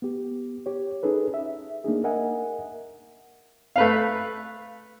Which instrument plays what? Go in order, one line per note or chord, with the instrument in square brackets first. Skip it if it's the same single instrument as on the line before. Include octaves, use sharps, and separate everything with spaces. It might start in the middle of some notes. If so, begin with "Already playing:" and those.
[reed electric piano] B3 G4
G4 C#5
C#4 D#4 G#4 A4 B4
E5
A#3 D4 D#4 G#4
A#4 D#5 E5 F#5 G#5
[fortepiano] A3 B4 F5